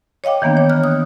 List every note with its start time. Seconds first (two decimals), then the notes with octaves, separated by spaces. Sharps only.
0.24 C#5 D#5 F5 G5 D6
0.42 D#3 E3 A#3 B3 D4
0.57 C#5
0.69 F6 F#6
0.84 D#6